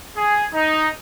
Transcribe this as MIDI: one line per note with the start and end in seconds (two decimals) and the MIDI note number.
0.17 0.46 68
0.54 0.89 63